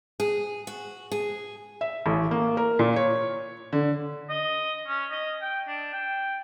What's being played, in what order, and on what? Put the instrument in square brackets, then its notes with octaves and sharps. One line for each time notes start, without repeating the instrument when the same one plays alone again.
[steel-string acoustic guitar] G#4
F#4
G#4
[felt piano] E5
A1
A#3
A#4
A#2
C#5
D3
[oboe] D#5
C#4
D#5
G5
D4
G5